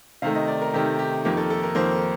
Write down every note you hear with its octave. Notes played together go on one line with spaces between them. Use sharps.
C3 D#3 A3 F5
D#5
D5
A#4
C3 D#3 A3 G4
G4
F2 D#3 A#3 G4
A4
A4
A#4
F2 D#3 A#3 C5